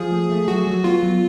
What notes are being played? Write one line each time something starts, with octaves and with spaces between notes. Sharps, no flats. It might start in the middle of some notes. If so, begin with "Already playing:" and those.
Already playing: F3 G#4
A3
A3
F#3 F#4
F#3
B3 F4
F#3